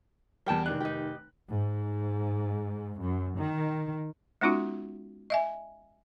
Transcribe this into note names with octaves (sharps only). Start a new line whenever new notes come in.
E2 G3 A#4 G5 A5
F1 D#3 D4 F#6
D#4 G4
G#2
F#2
D#3
G#3 B3 C#4 D#4 F4 F#4
D#5 E5 G#5